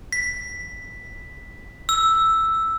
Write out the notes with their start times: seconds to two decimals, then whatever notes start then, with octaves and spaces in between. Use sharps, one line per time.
0.12 B6
1.89 E6